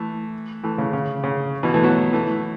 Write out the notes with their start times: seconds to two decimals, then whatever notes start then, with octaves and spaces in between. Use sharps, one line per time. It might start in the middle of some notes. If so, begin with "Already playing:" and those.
Already playing: E3 A3
0.63 E3 A3
0.78 C#3
0.93 C#3
1.23 C#3
1.63 B2 E3
1.74 E3 A3
1.83 F#3 B3
2.13 E3 A3